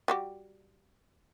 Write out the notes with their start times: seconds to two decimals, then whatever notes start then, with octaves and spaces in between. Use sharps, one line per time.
0.08 G3 F#4 G4